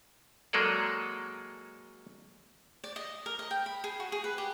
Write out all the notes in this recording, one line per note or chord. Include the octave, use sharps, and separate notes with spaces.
F#3 G#3 A#3 G#4 A4 D5
D5
D#5
A#4
D#5
G5
B5
G#4
F#4
G#4
B4
G4